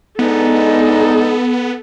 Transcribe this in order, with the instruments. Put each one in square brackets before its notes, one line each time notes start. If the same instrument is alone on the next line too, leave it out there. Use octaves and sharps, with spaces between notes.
[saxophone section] G#3 D4 D#4 [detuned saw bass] B3 [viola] A4